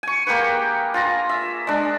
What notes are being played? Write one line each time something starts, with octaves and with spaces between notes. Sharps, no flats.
G#5 C#6
A#3 G4 G#4 B4
F4 G#4 A#5
E5
G#3 D4